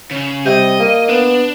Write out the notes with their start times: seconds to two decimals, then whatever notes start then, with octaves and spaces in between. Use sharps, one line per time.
0.11 C#3
0.46 C3 G3 D#5
0.80 A#3
1.09 B3 D4